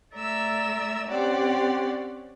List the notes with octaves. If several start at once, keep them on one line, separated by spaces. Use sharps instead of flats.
A3 D5 E5 A#5 E6
C4 C#4 G4 C#5 D5 F#5